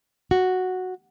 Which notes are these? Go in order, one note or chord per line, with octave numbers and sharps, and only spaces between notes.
F#4